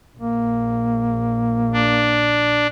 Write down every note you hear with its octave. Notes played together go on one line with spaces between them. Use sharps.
A#1 A#3
D4